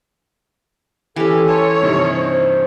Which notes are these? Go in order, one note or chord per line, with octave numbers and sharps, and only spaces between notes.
E3 C#4 G4 A4
C#5 G#5 A5 C6
G2 C3 D#3
C5